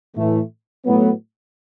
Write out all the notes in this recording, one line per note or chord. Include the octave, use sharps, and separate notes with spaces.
A2 E3 A3
A2 F#3 B3